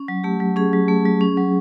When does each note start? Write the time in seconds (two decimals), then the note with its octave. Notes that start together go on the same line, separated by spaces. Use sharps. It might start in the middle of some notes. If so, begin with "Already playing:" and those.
Already playing: C#4
0.08 F#3
0.24 A3 G4
0.40 F#3
0.56 C#4 G#4
0.73 F#3
0.88 A3
1.05 F#3
1.21 C#4
1.37 F#3